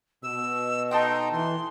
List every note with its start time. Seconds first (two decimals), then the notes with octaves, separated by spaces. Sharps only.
0.23 B2 E6
0.91 D#4 A4 D#5 G5 C6
1.32 E3 C6